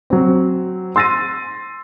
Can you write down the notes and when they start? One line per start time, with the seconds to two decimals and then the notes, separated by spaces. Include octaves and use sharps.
0.10 F#3 C4
0.96 C6 E6 A6 A#6 D#7